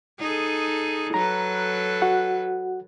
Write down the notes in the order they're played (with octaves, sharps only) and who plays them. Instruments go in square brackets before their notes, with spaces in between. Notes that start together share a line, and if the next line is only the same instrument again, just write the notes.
[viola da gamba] D#4 G#4 A4
[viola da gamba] F#3 A4 B4 [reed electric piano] A#5
[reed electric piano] F#4 F#5